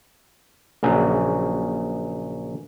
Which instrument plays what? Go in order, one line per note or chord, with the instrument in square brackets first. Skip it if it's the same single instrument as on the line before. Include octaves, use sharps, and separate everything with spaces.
[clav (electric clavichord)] A#1 C#3 F#3